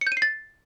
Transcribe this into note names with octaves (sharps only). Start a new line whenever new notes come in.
C#7
G6
D#7
C7
A6